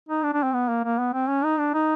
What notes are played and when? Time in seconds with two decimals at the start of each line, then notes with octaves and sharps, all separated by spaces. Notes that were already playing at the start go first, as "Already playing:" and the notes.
0.09 D#4
0.23 D4
0.33 D4
0.43 C4
0.53 B3
0.68 A#3
0.84 A#3
0.99 B3
1.13 C4
1.29 C#4
1.44 D#4
1.59 D4
1.74 D#4